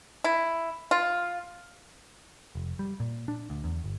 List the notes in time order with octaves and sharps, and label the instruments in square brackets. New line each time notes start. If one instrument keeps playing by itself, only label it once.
[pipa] E4
F4
[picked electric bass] F1
G3
A#2
D4
D2
E2
G1